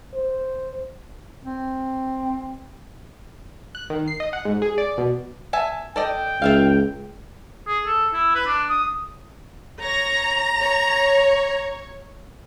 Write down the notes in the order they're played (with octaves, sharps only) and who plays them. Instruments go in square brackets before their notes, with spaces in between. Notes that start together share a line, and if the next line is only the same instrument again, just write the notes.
[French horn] C5
[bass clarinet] C4
[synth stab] F#6
D#3
C7
D#5
F#5
G#2
G#4
D5
B2
[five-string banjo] E5 G#5 A5
[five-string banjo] A4 D5 D#5 [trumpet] G5
[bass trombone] C#2 [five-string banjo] F4 E5 F5
[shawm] G#4
A4
E4
B4
D4
D#6
[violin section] C#5 A#6 [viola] A#5
[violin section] C#5